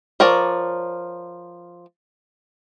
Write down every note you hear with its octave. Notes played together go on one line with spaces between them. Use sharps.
F3 A#4 C#5 D5